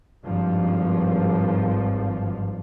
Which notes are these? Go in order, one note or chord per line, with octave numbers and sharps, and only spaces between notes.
G#1 G2 F3